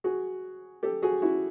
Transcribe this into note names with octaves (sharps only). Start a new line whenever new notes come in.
F#4 G#4
G4 A4
F#4 G#4
E4 F#4